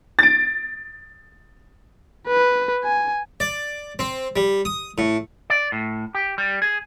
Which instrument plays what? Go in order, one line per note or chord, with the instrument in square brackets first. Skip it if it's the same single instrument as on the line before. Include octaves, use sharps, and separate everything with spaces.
[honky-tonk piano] A6 D7
[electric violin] B4
G#5
[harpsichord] D5
C4
G3
D#6
A2
[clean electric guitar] D5
A2
G4
G3
G#4